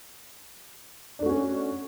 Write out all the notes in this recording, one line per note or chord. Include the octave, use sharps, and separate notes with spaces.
A3 C#4 D4 F#4